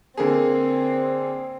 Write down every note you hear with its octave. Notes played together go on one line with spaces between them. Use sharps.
D3 A#3 C4 G#4